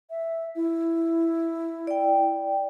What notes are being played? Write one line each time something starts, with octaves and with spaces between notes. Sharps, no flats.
E5
E4
D5 G5